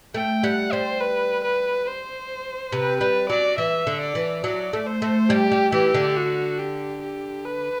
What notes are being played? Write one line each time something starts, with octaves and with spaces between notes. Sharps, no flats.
A3 G5
G3 F#5
G3 C5
B4
B4
C5
C3 B4
G3 B4
F#3 D5
E3 E5
D3
D5
E3
F#3 D5
A3
C5
A3
G3 G4
G3
E3 G4
D3
F#4
G4
G4
B4